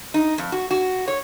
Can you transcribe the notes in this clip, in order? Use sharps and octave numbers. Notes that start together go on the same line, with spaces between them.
D#4
F2
F#4
F#4
C#5